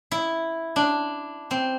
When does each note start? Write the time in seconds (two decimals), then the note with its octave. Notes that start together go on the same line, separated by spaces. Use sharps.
0.11 E4
0.76 D4
1.51 C4